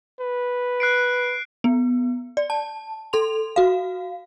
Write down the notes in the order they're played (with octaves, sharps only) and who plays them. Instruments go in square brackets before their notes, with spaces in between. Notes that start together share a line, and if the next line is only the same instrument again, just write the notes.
[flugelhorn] B4
[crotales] F#6 C7 D7
[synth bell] B3
D5
A5
A4 C6 F7
F#4 F5